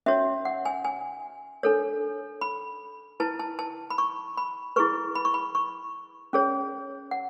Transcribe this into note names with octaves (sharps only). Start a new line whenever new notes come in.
C#4 F#4 C#5 E5
F#5
G#5
G#5
D4 A4 C#5
B5
E4 B4 A5
A5
A5
B5
C#6
B5
E4 G#4 B4 C#6
B5
C#6
B5
C#6
C#4 G#4 C#5
F#5